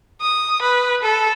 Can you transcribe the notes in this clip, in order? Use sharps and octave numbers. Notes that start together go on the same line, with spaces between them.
D#6
B4
A4